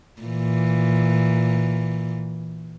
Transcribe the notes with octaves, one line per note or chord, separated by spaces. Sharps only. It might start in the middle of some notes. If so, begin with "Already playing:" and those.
A#2 E3